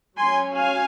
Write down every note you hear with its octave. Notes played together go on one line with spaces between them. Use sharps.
F#3 C#4 G#5 C6
F5 G#5